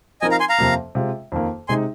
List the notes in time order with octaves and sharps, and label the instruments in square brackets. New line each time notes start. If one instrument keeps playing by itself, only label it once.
[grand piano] F3 C4 D#4 A#4 [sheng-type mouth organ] D#5 G#5
[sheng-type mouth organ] F5 A#5
G#5 C6
F5 A#5
[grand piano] F2 C3 F3 A#3
C3 G#3 F4
F2 D#3 A#3
[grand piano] C3 G#3 D#4 [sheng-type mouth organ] G#5 C6